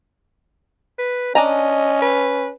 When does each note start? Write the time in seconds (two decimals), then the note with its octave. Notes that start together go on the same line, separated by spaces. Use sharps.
0.99 B4
1.35 C#4 D4 D#5 G#5 A#5
2.02 B4